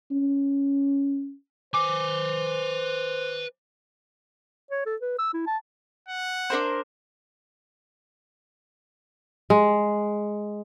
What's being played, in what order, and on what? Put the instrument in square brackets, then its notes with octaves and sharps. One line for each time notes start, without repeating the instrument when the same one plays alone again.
[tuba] C#4
[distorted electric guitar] B4 G#5 [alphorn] C5 [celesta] D6
[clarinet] C#5
A4
B4
E6
E4
A5
[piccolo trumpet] F#5
[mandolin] D4 A#4 C5
[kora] G#3